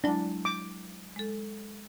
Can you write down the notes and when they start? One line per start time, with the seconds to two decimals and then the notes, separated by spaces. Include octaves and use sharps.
0.04 F#3 G#3 D4 E4
0.45 D6
1.16 G#3 A4